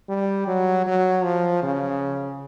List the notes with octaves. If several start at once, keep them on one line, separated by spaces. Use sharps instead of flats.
G3
F#3
F#3
F3
C#3